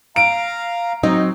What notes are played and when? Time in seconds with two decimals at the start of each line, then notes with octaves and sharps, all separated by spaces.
0.16 F5 A#5 D7
1.03 F#3 C4 D#4